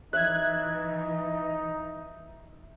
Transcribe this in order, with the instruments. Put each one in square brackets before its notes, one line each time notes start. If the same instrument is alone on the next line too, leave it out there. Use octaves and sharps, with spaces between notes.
[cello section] E3 [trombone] D#4 [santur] E5 [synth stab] F#6 G#6